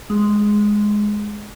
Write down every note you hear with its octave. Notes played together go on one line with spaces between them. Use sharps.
G#3